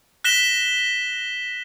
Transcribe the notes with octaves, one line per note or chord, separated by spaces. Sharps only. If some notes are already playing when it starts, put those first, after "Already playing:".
F#6 A#6 B6 E7 G7